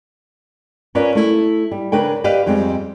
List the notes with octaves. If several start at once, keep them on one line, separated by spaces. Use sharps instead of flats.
C#4 F4 A#4 B4 C#5 D5
A3 E4
G3
C#3 D4 A#4 B4 C#5 G5
G4 B4 D5 D#5 F5
F2 G3 G#3 C4